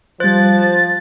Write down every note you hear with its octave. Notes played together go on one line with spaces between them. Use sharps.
F3 G3 C5 F#6 A6